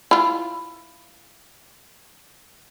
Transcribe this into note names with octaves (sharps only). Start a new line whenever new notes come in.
E4 F4